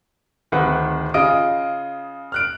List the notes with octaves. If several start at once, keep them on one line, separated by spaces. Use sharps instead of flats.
D1 D#3 C4 B4 F#5
C#3 F4 D#5 D#6 D7
F6 F#6 D7